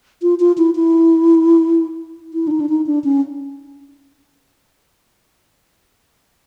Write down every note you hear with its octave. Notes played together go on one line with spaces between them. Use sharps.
F4
F4
E4
E4
E4
D4
D#4
D4
D#4
D4
C#4